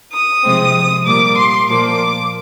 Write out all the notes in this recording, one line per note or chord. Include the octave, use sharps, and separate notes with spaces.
D#6
C3 F3 G#3 C4
A#2 G3 A#3 D6
C6
A#2 F3 A#3 D6